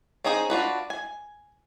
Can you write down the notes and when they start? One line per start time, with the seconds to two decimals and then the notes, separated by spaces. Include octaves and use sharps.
0.24 C4 C#4 D#4 G#4 C5
0.50 D4 F4 F#4 B4
0.90 G#5